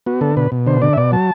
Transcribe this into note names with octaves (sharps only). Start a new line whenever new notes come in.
B3 F#4
D3 A4
B2 B4
B2
D3 C5
D3 D5
E5
B2 D5
F#3 A5